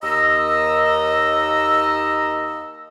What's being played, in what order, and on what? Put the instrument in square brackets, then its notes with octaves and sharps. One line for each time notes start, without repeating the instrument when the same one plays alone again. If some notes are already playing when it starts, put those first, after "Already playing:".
[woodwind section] D#2 D#5 A#5 E6